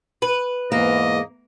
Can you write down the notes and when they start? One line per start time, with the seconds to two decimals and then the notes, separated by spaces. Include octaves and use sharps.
0.22 B4
0.72 E2 G#2 A#3 D#5